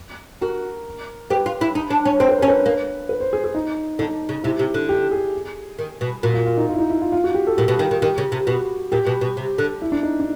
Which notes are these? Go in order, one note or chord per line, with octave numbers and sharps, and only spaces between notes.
F#4 A#4
G4 B4
F4
E4
D#4
D4
C#4
C4 C5
B4
C#4 A#4
B4
A#3
B4
C5
G#4
G#4
D#4
D3 D#4
C#3
C3 E4
C3
D3
G4
G#4
D#3
B2
A#2 F#4
F4
F4
D#4
F4
E4
D#4
E4
F4
F4
F#4
G4
A4
A#2 G4
B2
D#3
D#3
D#3 G4
C#3
C3
B2 F#4
A#2 G4
B2
B2
C3
D3
E4
D4
D#4
D4